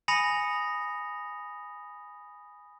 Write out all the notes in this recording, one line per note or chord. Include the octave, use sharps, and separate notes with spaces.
G#5 B5 D#6 A#6 C#7 F7